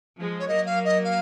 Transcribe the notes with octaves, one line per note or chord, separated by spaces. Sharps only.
F3 G#3
C#5
F#3 A#3 D#5
F5
D#5
F5